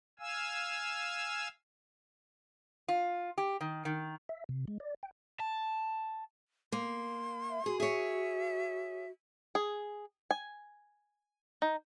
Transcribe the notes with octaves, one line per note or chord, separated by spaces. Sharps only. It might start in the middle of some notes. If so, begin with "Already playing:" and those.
F5 G#5 E6
F4
G4
D#3
D#3
E5
C3
G#3
D5
G5
A5
A#3 C6
E5
F#4 G#4
G#4 C#5 E5
G#4
G#5
D#4